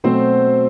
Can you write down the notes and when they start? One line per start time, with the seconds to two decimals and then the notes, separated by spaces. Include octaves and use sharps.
0.04 B2 F#3 A3 C4 C5